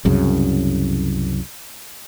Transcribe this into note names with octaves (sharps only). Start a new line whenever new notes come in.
C2 F#2 C#3